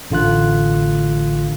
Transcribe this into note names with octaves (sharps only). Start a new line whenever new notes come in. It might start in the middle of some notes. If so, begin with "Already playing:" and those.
A1 D3 F4 F#6